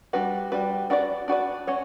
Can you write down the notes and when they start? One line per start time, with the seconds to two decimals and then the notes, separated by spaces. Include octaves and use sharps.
0.13 G3 D4 F#4 B4
0.52 G3 D4 F#4 B4
0.90 D4 F#4 B4 D5
1.28 D4 F#4 B4 D5
1.67 C#4 F#4 C#5